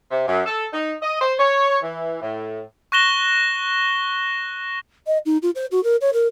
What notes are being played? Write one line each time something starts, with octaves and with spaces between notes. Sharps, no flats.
C3
F#2
A4
D#4
D#5
C5
C#5
E3
A2
C#6 F#6 A#6 E7 G7
D#5
D#4
F4
C5
F#4
A#4
C#5
A#4